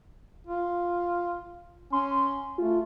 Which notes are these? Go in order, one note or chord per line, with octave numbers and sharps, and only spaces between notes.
F4
C#4 C6
A3 F4